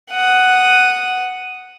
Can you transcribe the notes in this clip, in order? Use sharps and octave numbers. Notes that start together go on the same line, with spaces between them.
F#5 D#6